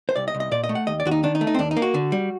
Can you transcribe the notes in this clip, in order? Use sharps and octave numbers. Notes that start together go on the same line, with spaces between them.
C5
C2 D5
D#5
C2
D#5
A#2 D5
D#5
A3
F#5
D#2 D#5
D5
D#2 F#4
D#4
D#3 D4
D#4
A3
D#4
C4
D#2 D4
D#4
A#3
F#4
D3
G3